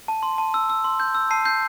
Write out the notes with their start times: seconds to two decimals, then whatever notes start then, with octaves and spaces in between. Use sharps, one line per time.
0.08 A5
0.23 C6
0.38 A5
0.54 E6
0.70 E6
0.84 C6
1.00 G6
1.15 E6
1.31 A5 C7
1.45 G6 C7